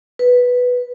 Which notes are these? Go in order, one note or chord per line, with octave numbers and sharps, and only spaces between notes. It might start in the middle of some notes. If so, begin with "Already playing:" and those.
B4